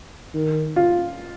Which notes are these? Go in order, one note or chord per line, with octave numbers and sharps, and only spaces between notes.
D#3
F4